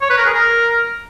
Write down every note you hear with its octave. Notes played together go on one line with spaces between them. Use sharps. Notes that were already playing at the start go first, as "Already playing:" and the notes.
C#5
B4
A#4
G#4
A#4